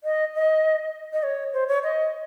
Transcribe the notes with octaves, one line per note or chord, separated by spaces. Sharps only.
D#5
D#5
D#5
C#5
C5
C#5
D#5